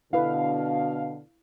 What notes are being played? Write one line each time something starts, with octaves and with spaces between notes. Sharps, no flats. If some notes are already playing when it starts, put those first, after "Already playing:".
B2 D3 E4 B4 F5